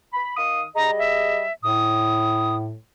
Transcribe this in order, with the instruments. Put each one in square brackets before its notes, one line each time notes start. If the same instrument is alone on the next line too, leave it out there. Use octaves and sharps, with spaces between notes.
[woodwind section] B5
D#3 F5 D#6
[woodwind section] G3 G#4 D#5 [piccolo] A#5
[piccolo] E5
[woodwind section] A2 [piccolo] D#6